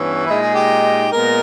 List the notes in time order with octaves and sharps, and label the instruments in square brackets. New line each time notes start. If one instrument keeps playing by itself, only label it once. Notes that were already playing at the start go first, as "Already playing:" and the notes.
Already playing: [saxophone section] G2 E3 B3 [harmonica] C#4
[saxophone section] A#2 G#3 D#4 [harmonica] E4
[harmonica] G#4
G4
[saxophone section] A#2 G#3 B3 [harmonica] A#4